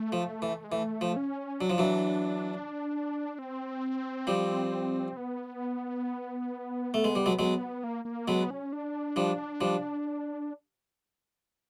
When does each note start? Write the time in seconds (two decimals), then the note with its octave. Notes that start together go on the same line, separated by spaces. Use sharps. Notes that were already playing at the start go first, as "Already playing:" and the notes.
Already playing: A3
0.12 F3
0.42 E3
0.64 G#3
0.72 E3 A3
1.01 F3
1.16 C#4
1.60 F#3 D4
1.70 F3
1.78 E3 F#3
3.39 C4
4.27 F3 G3
5.17 B3
6.94 A3
7.04 G#3
7.15 G3
7.26 F#3 G#3
7.39 F#3 G#3
7.84 A#3
8.05 A#3
8.28 F#3 G#3 B3
8.50 C#4
8.73 D4
9.16 F3 G3
9.61 F3 G3